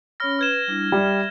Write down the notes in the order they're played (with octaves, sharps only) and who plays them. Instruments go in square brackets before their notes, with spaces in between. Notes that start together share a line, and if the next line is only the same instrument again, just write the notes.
[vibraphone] C#4 C#5 B5 [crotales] F6 A#6
[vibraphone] B4 [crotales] F6 G#6 E7
[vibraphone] G3 D4 E4
[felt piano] G3 [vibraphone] E5